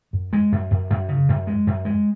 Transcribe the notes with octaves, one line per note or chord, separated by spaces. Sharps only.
F#2
G#3
F#2
F#2
F#2
C#3
F#2
G#3
F#2
G#3